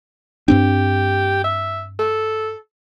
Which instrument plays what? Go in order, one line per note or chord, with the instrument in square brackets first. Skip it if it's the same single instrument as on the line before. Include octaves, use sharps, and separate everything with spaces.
[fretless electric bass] G2 C4 D4 [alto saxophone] G4
[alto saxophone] E5
A4